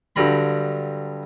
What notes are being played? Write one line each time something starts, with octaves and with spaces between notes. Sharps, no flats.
G2 D3 F#3 G3 A#5 B5